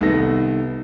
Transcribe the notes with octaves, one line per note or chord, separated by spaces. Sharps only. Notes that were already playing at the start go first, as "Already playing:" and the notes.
C2 D#3 B3 A4 A#6